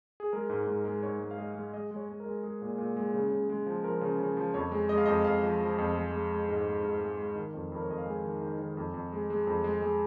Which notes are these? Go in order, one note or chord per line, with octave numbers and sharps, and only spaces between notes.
G#4
G#3 A#4
G#2
G#2 A#4
G#3
G#2 C#5
G#3
F5
G#3 D#5
G#3
G#3 D#5
G#3 C#5
G#3
A#4
G#3
G#3 G#4
A#2
A#2
G#3
C#3
C#3
G#3
F3
F3 A#4
C#3
C#3
F3
F2 C#5
G#3
G#3 D#5
F5
F2 D#5
F2 F5
F3
F3
F2
G#3
G#3
G#3
G#2
G#3
G#2
G#3
G#3
D#3
F2
F2 A#4
C#5
F2 D#5
F5
G#3 G#5
D#3
D#3
D#3
F2
F2
G#3
G#3
F2
G#3
G#3